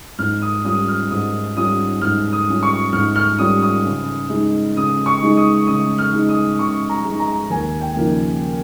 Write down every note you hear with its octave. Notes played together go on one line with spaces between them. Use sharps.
G#2 F6
D#6
G3 C#4 F4 D#6
F6
G#2 D#6
G3 C#4 F4 D#6
G#2 F6
D#6
G3 C#4 F4
C#6
G#2 F6
F6
G3 C#4 F4 D#6
D#6
C#3
G#3 D#4
C#3 D#6
C#6
G#3 D#4
D#6
C#3 D#6
F6
G#3 D#4
D#6
C#3 C#6
A#5
G#3 D#4
A#5
D#2 G#5
G5
C#3 F3 A#3 D#4